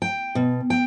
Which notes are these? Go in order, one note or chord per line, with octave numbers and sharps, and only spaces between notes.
G5
B2
G5